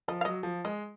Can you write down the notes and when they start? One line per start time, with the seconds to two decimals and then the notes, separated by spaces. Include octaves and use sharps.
0.08 F3 D#5
0.21 F5
0.25 F#3 D#5
0.43 F3
0.65 G#3 D#5